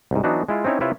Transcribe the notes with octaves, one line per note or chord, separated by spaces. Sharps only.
C2 G#2
E3 F#3 B3 D4 D#4 F#4
G#3 E4 F4
C4 C#4 D#4 E4 C#5
C3 E4 F4 B4 C#5 E5